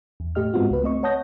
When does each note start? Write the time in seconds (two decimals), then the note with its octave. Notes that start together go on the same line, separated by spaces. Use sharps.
0.20 E2
0.35 A2 A3 G4 D#5 F6
0.54 G#2 G#3 B3 C4 F4 F#4
0.70 C#2 B4
0.83 A3 C4 D#5 C#6
1.03 C#5 F#5 A5 D#6 G6 A#6